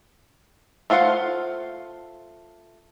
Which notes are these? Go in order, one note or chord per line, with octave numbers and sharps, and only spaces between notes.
A3 F4 C5 F5 F#5